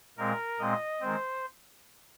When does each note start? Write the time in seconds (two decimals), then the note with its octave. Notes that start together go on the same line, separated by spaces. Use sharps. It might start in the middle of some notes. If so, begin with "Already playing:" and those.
0.17 A#2 G#3 C4 A#4
0.59 A#2 G#3 C4 D#5
1.01 D#3 G#3 C4 C5